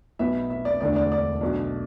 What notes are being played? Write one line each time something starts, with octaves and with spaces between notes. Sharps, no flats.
B1 B2 B3 E5
E5
D5
E1 D2 D3 A3 D4 D5
D5
D5
B1 B2 A3 D4